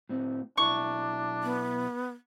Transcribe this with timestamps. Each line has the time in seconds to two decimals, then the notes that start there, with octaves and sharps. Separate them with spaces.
0.09 A2 C4
0.58 B1 D4 E4 A#4 C#6
1.43 B3